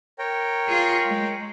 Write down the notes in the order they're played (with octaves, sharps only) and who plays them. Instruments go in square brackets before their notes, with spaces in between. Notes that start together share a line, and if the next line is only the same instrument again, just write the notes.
[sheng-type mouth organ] A#4 C#5 G5
[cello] F4 G#4
G#3